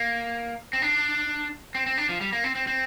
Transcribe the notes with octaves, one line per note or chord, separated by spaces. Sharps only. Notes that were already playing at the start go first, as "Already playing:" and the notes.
Already playing: A#3
C4
D4
C4
C4
D4
F3
G3
A#3
C4
C4
C4